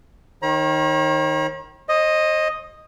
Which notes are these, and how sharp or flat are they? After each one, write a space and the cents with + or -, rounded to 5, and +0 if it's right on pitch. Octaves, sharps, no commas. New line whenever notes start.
D#3 +0 C#5 -45 A#5 +45
C5 +40 D#5 +0